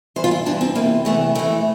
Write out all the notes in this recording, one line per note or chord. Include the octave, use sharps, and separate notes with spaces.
G2 E3 C5
F4
E4
G2 E3 D4
C4
E2 C3 E3 A#3
E2 C3 E3 A3
F2 E3 A3